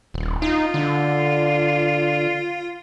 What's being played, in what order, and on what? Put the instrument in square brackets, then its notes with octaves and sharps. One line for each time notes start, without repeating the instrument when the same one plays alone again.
[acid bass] D#1
[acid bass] D#4 [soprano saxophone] F4
[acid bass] D3